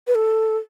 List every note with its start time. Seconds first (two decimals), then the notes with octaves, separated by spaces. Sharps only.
0.07 B4
0.15 A4